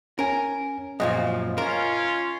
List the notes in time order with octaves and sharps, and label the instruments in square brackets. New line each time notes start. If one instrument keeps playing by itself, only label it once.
[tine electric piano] C#4 G#5 [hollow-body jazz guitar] A#4
[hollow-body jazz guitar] F#2 A#2 F3 [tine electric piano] D#5
[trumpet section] C#4 F4 [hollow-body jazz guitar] A#4